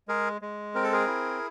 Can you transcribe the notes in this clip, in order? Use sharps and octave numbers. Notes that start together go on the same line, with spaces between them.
G#3 G#4 A#4
G#3
C4 A#4
A4
G#4 A#4
E4